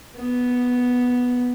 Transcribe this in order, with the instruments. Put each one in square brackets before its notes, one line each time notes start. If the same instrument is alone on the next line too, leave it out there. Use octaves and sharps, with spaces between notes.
[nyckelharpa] B3